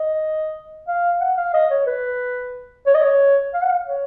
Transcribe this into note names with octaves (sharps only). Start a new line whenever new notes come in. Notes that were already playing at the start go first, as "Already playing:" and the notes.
Already playing: D#5
F5
F#5
F5
D#5
C#5
B4
C#5
D#5
C#5
F5
F#5
F5
C#5